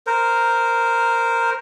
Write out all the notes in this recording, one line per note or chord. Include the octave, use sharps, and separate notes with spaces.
A#4 C5